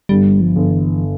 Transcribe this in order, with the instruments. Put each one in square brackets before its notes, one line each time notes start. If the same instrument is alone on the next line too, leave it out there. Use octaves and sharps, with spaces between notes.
[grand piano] G1 [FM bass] G3
[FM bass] F3
[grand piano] G1
[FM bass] E3